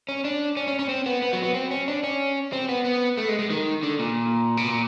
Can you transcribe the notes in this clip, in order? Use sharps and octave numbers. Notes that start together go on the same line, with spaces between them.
C#4
D4
C#4
C#4
C#4
C4
B3
B3
F#3
B3
C4
C#4
D4
C#4
C4
B3
B3
A3
G#3
G#3
D#3
D3
A#2
B2
A#2